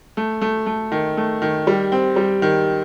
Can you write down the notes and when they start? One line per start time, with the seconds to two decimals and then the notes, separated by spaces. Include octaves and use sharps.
0.17 A3
0.42 A3
0.66 A3
0.92 D#3
1.17 A3
1.42 D#3
1.67 G3
1.92 C4
2.16 G3
2.42 D#3